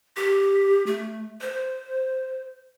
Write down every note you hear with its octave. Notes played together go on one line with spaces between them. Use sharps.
G4
A3
C5